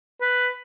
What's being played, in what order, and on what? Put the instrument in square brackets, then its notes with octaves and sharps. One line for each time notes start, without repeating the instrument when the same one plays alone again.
[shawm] B4